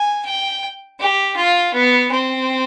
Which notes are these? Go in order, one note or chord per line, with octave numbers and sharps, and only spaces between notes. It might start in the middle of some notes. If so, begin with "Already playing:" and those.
Already playing: G#5
G5
G4
F4
B3
C4